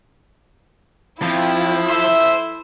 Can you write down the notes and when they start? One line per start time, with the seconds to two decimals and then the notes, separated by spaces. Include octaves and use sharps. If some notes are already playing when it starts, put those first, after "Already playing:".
1.22 F2 F3 E4
1.89 A4 C5 E5